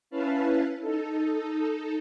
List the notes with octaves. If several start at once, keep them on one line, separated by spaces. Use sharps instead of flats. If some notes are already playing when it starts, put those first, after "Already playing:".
C#4 E4 B4 F5 A5
D#4 A4